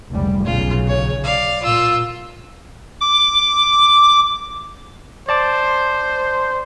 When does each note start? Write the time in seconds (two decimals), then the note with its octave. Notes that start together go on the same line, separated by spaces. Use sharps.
0.11 F1 C#2 G3
0.45 B1 C#3 F4
0.87 C#5
1.24 D5 F5
1.63 A#2 F4 E6
3.01 D6
5.29 C5 D5 A5 D6